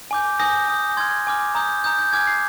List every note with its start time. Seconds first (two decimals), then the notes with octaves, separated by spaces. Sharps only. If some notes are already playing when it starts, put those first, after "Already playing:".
0.11 G#5 D6 G6
0.40 G#5 D#6 G6 A#6
0.68 G#5 D#6 G6
0.97 C6 F6 G#6
1.27 G#5 D6 F6
1.55 A#5 D#6 G6
1.84 A#5 D#6 G6
1.99 G6
2.13 G#5 D6 F6 G#6
2.27 C7